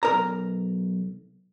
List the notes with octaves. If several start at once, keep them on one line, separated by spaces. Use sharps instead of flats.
B1 A#4 A#5